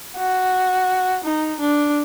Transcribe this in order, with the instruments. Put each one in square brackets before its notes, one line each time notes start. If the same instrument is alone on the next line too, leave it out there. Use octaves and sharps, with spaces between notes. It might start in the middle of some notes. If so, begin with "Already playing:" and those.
[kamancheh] F#4
D#4
D4